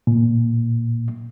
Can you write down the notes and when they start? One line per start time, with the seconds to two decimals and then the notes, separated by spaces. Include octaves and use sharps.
0.07 A#2